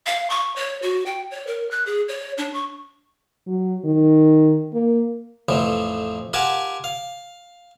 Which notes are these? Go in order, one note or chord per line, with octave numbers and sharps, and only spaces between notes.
F5
C#6
C#5
F#4
G5
C#5
A#4
F#6
G#4
C#5
D4
C#6
F#3
D#3
A#3
A1 F2 E3 F3
F4 G4 A#4 F#5 G#5 A5
F5